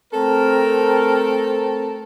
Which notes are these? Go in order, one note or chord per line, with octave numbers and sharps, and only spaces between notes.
A3 C4 A4 A#4